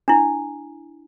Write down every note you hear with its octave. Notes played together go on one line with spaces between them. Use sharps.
D4 E4